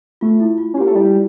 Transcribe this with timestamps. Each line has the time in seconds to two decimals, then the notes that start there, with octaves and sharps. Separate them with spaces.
0.21 A3 F4
0.40 E4
0.58 F4
0.74 C#4
0.77 A#3 G4
0.87 A3
0.95 G3 E4